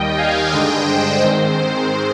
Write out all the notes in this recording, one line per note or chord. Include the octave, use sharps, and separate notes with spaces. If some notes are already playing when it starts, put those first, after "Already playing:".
Already playing: D#2 D#3 G3 D#5 G5
F5 G#5
G2 D3 G#3 D4 D#5 G5
C5
G#2 D#3 G#3 C4 C5
C5